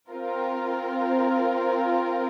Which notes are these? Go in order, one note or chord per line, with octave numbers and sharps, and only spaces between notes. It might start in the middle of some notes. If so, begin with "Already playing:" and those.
C4 F4 A#4